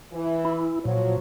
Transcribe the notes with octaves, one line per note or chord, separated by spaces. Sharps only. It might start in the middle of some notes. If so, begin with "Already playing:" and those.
E3
E4
A#2 F3 F#3 C#5